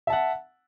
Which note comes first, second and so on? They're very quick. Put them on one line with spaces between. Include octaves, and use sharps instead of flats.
E5 A5 F#5